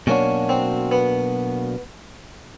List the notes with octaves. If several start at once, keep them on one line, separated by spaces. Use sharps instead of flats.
B2 F#3 A#3 C#4 D4 F#4
C4
B3